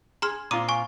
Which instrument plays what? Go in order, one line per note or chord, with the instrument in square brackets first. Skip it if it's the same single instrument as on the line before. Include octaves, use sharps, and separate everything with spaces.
[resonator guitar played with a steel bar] G#4 [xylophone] A#5 C6 F6
[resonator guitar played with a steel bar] A#2 C4 F4 [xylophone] D6 D#6 D#7
[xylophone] G#5 C#6